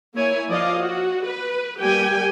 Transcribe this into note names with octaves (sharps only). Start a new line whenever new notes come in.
A#3 E4 C#5 G#5
F3 D5 D#5 F5
F#4
B4
G3 A#3 G4 G5 G#5